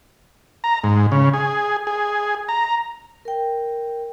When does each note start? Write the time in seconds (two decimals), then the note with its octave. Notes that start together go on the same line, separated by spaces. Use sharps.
0.64 A#5
0.84 G#2
1.12 C#3
1.34 G#4
1.87 G#4
2.49 A#5
3.25 A#4 G5